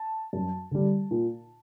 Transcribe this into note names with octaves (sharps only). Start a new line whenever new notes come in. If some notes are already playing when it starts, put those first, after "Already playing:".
Already playing: A5
F#2
D3 G3
A#2